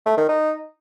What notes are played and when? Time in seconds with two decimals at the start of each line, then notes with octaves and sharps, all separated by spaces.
0.06 A3
0.17 D#3
0.29 D#4